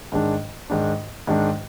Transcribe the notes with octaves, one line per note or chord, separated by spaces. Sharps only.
G#2 D#3 G#3 D4
G#2 D#3 G#3 D4
G#2 D#3 G#3 D4